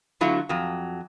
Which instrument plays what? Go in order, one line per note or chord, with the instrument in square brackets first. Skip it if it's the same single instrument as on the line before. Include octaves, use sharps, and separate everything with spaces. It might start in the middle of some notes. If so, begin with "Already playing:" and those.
[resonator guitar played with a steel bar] D3 F#3 A3 E4 F4
F2 F#3